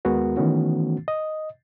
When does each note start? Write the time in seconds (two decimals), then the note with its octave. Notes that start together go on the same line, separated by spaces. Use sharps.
0.05 D#2 G#3 B3 F#4 A#4
0.37 D#3 E3 A3 B3 C#4 F#4
1.08 D#5